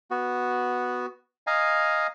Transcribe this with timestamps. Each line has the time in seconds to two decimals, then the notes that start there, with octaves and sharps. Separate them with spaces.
0.11 B3 F#4
1.47 D#5 F5 G#5 A#5